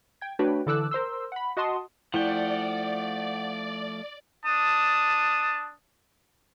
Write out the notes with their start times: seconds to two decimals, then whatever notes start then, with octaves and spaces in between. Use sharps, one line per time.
0.21 G5 G#6
0.39 A3 D4 F#4 B4 C#5 G5
0.66 D3 E3 A4 D6 E6 F#6
0.91 A#4 C5 C6 E6
1.32 F#5 B5
1.57 F#4 D#5 F#5 A5 C6 D#6
2.14 F3 A3 E4 D5 F#5 G5
4.45 D4 A5 D#6